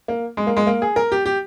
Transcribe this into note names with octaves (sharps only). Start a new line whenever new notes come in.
A#3
G#3
A#3
G#3
A#3
G#4
A#4
G4
G4